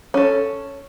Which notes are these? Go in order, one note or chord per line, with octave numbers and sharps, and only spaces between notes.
C#4 A4